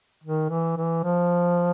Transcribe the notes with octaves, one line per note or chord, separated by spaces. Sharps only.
D#3
E3
E3
F3